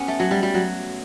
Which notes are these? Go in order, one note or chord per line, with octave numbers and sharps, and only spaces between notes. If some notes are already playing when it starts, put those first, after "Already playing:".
Already playing: B3 C#4 G4
A3
F#3
G3
G3
F#3